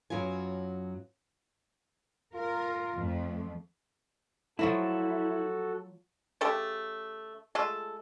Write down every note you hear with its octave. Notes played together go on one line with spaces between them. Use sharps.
F#2 F#3 B3 F4 G#5
F4 A#4
F2 F3 A3
F3 F#3 A3 E4 F#4 A4
C#3 A3 G4 A4
G#3 A3 F4 A4